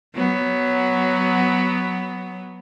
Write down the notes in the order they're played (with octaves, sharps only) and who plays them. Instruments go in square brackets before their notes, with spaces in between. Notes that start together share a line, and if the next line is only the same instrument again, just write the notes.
[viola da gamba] F#3 B3